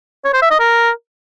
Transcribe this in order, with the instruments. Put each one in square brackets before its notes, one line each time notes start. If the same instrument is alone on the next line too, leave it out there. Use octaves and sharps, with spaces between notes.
[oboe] C#5
C5
E5
D#5
A#4